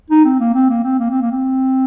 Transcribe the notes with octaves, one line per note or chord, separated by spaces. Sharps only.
D#4
C4
A#3
C4
A#3
C4
A#3
C4
A#3
C4